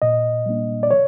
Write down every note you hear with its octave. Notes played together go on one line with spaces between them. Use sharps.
A#2 D#5
G3 A#3 D4
D5
C#5